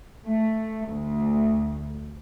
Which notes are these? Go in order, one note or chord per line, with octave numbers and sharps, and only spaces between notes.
A3
D2